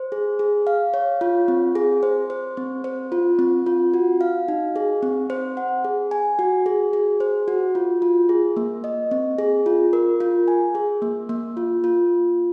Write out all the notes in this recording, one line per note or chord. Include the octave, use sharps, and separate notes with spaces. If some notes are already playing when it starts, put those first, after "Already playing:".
Already playing: C5
G#4
G#4
F5
C#5
F4
C4
G#4
C5
C5
C4
C5
F4
C4
F4
F#4
F5
D#4
G#4
C4
C5
F#5
G#4
G#5
F#4
G#4
G#4
C5
F#4
F4
F4
G#4
A#3
D#5
C4
G#4
F4
A#4
F4
G#5
G#4
A#3
A#3
F4
F4